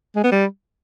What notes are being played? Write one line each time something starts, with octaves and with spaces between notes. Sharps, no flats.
G#3
B3
G3